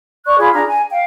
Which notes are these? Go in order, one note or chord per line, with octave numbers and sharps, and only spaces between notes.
D5 C#6 F#6
F4 G#4 B5
D4 G#4 A#5
G#5
F5 G5